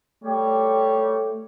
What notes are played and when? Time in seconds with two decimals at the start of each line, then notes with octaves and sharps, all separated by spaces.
0.24 G3 A3 G4 C#5